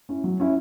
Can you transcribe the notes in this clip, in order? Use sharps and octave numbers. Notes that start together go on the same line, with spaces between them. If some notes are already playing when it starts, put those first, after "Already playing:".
C#4 E4
F#3
C#4 E4